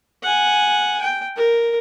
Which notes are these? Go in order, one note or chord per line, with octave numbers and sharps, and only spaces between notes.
F#5 G#5
G5
A#4